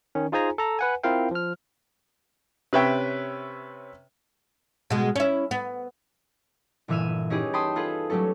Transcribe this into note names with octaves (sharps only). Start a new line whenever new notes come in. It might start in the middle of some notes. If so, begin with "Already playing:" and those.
D#3 C#4
D#4 F4 G#4 C5 G#5 A#5
A4 A#5
B4 F#5 G#5
C4 E4 F4 A#4 F5 G5
F3 F6
C3 C#4 B4 C#5 E5 G5
B2 G#3
C#4 E4
B3
G1 A#2 E3 E5 F6 D#7
C#4 D#4 E4 G4 G#4 B4
G5 A5 B5 C6 D#6 G6
F4 G#4 A4 B4
F#3 G3 A3 C#4 A4